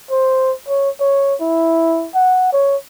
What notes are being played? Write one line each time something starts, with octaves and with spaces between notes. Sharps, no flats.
C5
C#5
C#5
E4
F#5
C#5